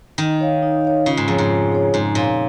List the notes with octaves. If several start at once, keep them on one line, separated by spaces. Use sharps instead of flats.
D#3 D#4
C#5 F5
D#4
C#5 F5
C#3 F4
G#2
F2 G#4 C#5
G#2
F4
G#4 C#5
G#2 D#4
A#2 C#5 F5